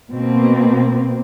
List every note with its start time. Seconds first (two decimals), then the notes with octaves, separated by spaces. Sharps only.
0.14 B2 A#3 C4